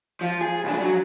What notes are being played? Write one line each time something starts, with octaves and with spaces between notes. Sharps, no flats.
F3
G#4
C2 D4
F#3